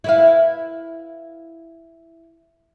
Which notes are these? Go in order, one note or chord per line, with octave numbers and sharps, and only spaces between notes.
E4 B4 F5